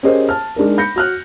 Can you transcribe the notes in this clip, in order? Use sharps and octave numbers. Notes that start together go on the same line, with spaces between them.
C#4 G4 G#4 A#4 C5 D#5
A5 F6
G#3 D4 D#4 A#4
B5 G6 A#6 C#7
F#4 F6 F#6